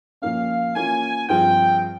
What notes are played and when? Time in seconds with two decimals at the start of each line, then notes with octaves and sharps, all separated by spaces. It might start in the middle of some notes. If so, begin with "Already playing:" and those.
0.22 A#2 F3 A#3 C#4 F5
0.76 E3 A#3 C#4 F4 G#5
1.29 G2 F3 C4 F4 G#4 G5